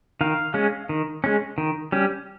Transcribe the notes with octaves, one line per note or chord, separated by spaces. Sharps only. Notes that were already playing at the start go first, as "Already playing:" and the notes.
D#3 F5
G#3 C#4
D#3
G#3 C#4
D#3
G3 C#4